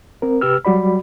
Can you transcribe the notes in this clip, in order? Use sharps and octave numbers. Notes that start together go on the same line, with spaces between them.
C4 A#4
C3 G4 B4 E6 F6
F#3 G3 F#4 D5 B5